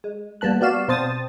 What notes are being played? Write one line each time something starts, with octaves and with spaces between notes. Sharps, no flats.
G#3
G3 A#3 B3 A5 F#6
G3 B3 F#4 D5 F5 E7
B2 C4 C5 A5 D#6 A6